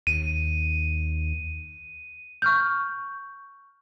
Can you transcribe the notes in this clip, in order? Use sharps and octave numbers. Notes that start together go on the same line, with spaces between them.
D#2 D#7
C#6 F6 G6